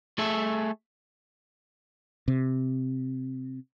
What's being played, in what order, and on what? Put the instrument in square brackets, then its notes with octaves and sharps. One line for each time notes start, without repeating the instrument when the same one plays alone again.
[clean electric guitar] A3 G#4 A4 E5
[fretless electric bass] C3